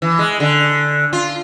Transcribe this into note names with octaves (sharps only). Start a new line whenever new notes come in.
E3
G#3
D3
F4